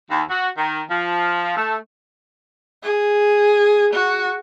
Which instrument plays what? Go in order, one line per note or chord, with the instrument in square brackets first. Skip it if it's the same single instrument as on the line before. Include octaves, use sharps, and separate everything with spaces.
[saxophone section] D#2
F#4
D#3
F3
A3
[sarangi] G#4
F#4